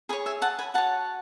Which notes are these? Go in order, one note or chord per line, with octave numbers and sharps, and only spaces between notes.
G#4 C#5 G#5 B5
E5 G#5
F#5 A5
G#5 B5
F#4 C#5 F#5 A5